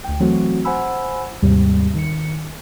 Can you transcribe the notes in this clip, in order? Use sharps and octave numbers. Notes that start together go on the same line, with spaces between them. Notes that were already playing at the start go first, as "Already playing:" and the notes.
D2 G5
E3 F#3 A3 C4 F#4
C5 F#5 G#5 B5 E6
D#2 G#2 C3 G3
D#3 C#7